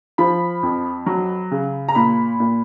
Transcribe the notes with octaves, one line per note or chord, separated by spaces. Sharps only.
F3 B5
F2
F#3
C#3
A#5
A#2 B5
A#2